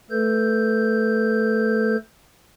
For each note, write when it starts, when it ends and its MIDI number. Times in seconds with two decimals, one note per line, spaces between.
0.10 1.96 57
0.10 1.96 69
0.10 1.96 71
0.10 1.96 91